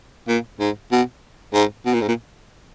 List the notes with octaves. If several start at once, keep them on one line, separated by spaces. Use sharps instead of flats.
A#2
G#2
B2
G#2
B2
A#2
G#2
A#2